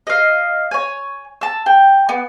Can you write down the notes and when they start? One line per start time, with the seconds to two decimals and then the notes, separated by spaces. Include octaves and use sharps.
0.07 D#5 F5
0.71 C#5 G#5
1.41 A5 E6
1.66 G5
2.09 B3